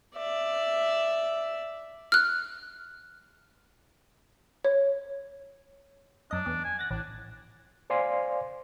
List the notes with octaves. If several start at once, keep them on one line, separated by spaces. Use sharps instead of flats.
D5 E5
F6 F#6
C#5
F#2 D4 D#5
E2
G#5
F#5 A6 A#6
A1 D4
C5 D5 F5 G#5 C6